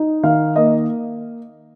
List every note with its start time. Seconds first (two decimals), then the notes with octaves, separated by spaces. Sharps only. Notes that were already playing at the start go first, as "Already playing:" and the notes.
Already playing: D#4
0.23 D#3 F5
0.56 A#3 D#5